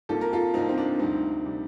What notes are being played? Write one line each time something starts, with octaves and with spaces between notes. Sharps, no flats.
C2 C3 F3 A#3 A4
A#4
F4 A4
C2 C3 F3 A#3 C4 D#4
C4
D4
D2 C3 G3 C4 D#4
C3 G3